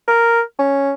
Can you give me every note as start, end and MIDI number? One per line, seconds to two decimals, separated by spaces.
0.08 0.41 70
0.59 0.93 61